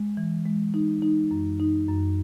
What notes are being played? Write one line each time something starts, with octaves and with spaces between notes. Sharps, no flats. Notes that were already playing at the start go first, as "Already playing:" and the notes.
Already playing: G#3
E3
G#3
D#4
D#4
F#2
D#4
F#2